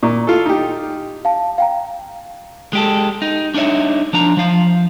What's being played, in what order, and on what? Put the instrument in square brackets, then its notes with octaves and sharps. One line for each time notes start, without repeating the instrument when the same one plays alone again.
[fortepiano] A#2 [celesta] A#5 C#6
[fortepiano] F4 A4
D#4 G4
[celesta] F5 A5
F5 G5 A#5
[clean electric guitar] G#3 G4 A4
D#4
D4 D#4 F#4 C#5 E5
F3 D4 A#5
F3 F5